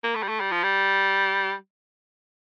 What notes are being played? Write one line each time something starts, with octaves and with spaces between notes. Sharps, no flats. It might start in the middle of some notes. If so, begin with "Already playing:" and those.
A#3
A3
G3
A3
G3
F3
G3